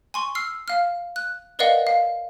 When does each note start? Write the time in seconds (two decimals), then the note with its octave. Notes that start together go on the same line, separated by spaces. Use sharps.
0.14 G#5 C6 C#6
0.35 E6 F6 C7
0.68 F5 F6
1.16 F#6
1.59 A#4 B4 D5 D#5 F5 F#5
1.87 F5